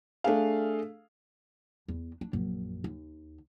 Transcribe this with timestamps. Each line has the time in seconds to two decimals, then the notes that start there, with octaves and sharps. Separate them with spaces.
0.24 A3 D4 G#4 F5
1.88 E2
2.21 D4
2.33 A#1 F#2
2.84 D#2